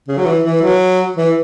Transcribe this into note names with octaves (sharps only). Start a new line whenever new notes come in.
C#3
F#3
E3
E3
F#3
E3